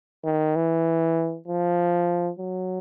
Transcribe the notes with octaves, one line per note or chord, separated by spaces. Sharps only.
D#3
E3
F3
F#3